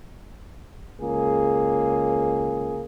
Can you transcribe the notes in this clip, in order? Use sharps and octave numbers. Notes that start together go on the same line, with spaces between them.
C#2 A#3 G#4